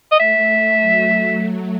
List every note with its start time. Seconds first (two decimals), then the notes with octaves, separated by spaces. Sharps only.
0.12 D#5
0.19 A3 E5
0.81 F#3